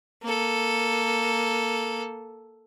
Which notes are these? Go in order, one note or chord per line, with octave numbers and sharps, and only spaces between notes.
A#3 A4